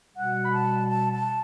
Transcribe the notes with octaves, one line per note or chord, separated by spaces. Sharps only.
B2 G3 F#5
B5
A5
A5
A5